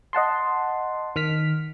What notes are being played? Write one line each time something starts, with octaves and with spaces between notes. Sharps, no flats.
D#5 F#5 A5 C6
D#3 F6 B6